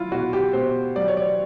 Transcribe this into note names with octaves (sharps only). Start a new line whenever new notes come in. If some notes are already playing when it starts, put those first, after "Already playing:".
Already playing: F#3 E4 F4
B2 F#4
G4
B2 C5
F#3 D5
C#5
D5